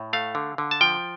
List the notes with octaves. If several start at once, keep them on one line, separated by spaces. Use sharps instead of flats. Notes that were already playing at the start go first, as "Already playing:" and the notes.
Already playing: A2
A3 F5
D3
D3
A5
F3 G5